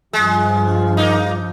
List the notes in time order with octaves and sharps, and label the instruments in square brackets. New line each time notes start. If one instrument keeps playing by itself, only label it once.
[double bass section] G2 F3 [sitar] G#3
[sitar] A#3 D#4